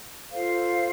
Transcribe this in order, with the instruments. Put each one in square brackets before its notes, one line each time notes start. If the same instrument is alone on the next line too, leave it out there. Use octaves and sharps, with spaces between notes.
[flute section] F4 A4 C5 F5